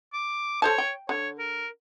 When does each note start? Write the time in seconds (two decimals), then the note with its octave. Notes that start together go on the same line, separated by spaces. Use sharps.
0.14 D6
0.62 A4 C5 C#5 A5
0.78 G5
1.09 D3 C#5
1.39 A#4